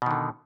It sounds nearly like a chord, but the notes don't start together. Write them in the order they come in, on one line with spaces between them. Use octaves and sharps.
B2 D#3 D3